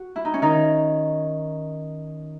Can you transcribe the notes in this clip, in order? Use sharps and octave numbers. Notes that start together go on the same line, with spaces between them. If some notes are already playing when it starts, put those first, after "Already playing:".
Already playing: F#4
E4
D#4
C#4
D#3 D#4